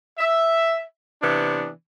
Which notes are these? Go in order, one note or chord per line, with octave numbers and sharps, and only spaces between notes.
E5
C3 E3 B3 D4